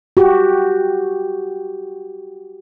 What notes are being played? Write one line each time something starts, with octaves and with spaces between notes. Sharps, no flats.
F#4 G4